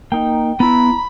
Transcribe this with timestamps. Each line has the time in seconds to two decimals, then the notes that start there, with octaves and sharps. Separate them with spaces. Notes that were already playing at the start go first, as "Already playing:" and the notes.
0.12 A#3 D#4 G5
0.60 B3 E4 A#5 B5